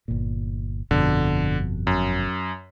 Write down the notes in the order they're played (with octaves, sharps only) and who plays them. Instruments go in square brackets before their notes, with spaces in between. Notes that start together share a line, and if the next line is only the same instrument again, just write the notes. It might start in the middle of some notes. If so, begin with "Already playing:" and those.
[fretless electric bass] G1 A#2
[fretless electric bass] G1 F2 B2 [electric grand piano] D3
[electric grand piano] F#2